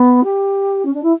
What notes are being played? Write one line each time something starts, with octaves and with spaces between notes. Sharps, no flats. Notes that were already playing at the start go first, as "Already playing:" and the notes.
Already playing: B3
G4
C#4
D4
E4